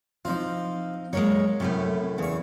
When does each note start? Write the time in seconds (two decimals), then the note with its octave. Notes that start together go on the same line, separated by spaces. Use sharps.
0.25 F3 C4 D#4 F4
1.13 F#3 G#3 A#3 C#5
1.60 F#2 A2 C3 G3 A3
2.18 E2 C#3 C#6